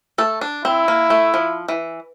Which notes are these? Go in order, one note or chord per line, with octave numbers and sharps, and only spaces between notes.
A3 A4
D4
C4 E4
A#3
A3
F3
E3